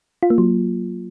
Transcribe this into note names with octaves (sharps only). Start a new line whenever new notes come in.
F4
A#3
F#3